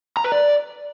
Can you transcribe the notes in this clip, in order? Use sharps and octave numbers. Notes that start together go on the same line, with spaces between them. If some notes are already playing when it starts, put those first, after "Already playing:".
A#5
B4
D5